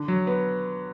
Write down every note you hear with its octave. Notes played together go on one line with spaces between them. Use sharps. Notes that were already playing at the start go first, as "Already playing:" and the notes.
Already playing: D3
F#3
B3